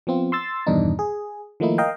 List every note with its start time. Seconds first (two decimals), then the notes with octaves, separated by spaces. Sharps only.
0.07 F3 B3 C4 F4
0.32 C6 E6 A6
0.67 E2 G2 B2 D#3 D4 D#4
0.99 G#4
1.60 D#3 F3 A3 A#3 D#4 E4
1.78 A#4 D#5 F5 G5